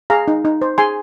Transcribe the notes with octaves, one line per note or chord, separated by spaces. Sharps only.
G#4 F5 A#5
D#4
D#4
C5
G#4 G#5 C6